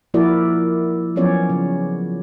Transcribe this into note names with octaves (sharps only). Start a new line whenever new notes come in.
F3 A#3 E4 F#4 A#4 D5
F3 F#3 B3 C#4 C#5 D5
C#3